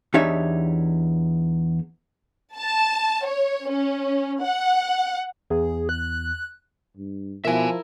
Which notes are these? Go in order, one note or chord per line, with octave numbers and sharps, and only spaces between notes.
E2 D4 D#4 G4 C#5 E5
A5
C#5
C#4
F#5
E2 G#4
F#6
G2
B2 F3 E4 A#4 E5 G#5